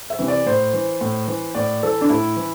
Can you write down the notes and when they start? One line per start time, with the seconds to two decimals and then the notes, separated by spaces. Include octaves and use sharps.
0.10 E5
0.18 C3 E3
0.28 D5
0.47 A2 C5
0.73 E3
1.01 A2
1.28 E3
1.55 A2 D5
1.83 E3 A4
2.01 D4
2.09 A2 E4
2.36 E3